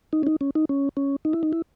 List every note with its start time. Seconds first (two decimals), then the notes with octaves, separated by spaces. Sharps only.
0.13 D#4
0.23 C#4
0.27 D#4
0.41 C#4
0.55 D#4
0.69 C#4
0.97 C#4
1.25 D#4
1.33 E4
1.43 D#4
1.53 E4